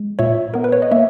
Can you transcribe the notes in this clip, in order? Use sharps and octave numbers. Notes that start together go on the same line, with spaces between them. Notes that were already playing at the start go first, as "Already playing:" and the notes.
Already playing: G#3
A#2 C#5 E5
B3 A#4
B4
C#5
D#5
A#3 C#5 E5